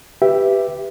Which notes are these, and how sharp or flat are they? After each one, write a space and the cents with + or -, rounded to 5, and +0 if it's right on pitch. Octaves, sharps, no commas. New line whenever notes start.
G4 +0 B4 +0 E5 +10